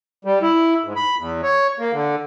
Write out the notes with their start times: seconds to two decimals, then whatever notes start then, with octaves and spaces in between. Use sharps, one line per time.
0.25 G3
0.42 E4
0.84 G#2
0.96 B5
1.19 E2
1.43 C#5
1.79 A#3
1.92 D3